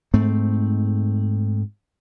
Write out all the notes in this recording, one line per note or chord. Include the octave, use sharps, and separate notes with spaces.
G#2 A3 C4